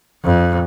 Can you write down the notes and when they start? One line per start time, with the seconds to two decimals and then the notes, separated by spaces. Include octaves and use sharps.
0.24 F2